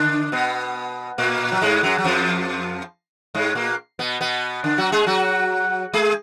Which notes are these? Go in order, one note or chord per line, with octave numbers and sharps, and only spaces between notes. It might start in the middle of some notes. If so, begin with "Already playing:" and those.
Already playing: D3 D4
B2 B3
A#2 A#3
F#3
G#2 G#3
F#2 F#3
F#3
F2 F3
G#2 G#3
A#2 A#3
B2 B3
B2 B3
D3 D4
F#3 F#4
G#3 G#4
F#3 F#4
G#3 G#4